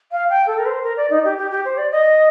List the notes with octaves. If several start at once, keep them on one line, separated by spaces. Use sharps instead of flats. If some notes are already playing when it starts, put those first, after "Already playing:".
F5
G5
A4
A#4
C5
A#4
D5
D#4
G4
G4
G4
C5
D5
D#5